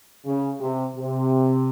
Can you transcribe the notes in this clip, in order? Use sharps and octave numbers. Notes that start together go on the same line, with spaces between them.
C#3
C3
C3